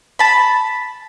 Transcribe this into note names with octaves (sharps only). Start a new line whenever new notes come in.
A5 B5